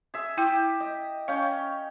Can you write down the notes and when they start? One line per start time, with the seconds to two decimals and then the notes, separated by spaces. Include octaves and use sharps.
0.14 G#4 E5
0.37 E4 G4 G5
0.80 D#5
1.28 C#4 F5 G5
1.43 F5